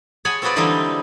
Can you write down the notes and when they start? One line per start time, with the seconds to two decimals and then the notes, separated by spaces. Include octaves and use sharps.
0.25 G#4 C#5 F#5 G#5 A5 B5
0.42 C4 F4 F#4 G#4 B4 D5
0.56 D3 E3 G3 G#3 C4 D#4